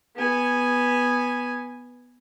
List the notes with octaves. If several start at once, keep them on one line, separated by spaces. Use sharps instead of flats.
B3 G#5